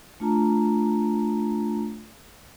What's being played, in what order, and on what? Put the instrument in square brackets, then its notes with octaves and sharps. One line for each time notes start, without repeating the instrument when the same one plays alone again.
[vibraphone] A3 D4 F4 A5 A#5